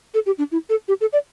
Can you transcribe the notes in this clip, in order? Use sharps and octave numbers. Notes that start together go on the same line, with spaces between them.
A4
G4
D4
E4
A4
G4
A4
D5